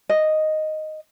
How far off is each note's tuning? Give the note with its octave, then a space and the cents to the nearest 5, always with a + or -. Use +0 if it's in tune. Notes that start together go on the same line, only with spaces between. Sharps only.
D#5 -5